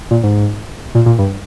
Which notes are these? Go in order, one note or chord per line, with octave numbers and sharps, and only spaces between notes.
A#2
G#2
A#2
A#2
G2